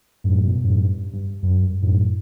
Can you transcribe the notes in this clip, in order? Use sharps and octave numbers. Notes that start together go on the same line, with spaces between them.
F#2 A2
G2 B2
F#2 A2
G2
G2
F#2
G2
F#2 A2